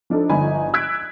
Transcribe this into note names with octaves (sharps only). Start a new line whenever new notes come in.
F3 D4 D#4 A4
G1 F3 D#4 D5 G#5 B5
E6 F#6 G#6 B6 D7